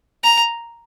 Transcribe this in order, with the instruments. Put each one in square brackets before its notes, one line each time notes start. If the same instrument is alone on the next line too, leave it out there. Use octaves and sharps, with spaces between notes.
[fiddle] A#5